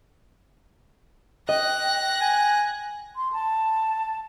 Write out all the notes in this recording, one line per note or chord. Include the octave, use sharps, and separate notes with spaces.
D#5 G5 F#6 A#6
G#5
C6
A5